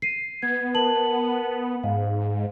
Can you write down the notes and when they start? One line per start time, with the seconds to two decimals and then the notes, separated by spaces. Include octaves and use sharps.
0.02 C7 D#7
0.42 B3 G#6
0.74 A#4 A5 F#7
1.83 G#2 F5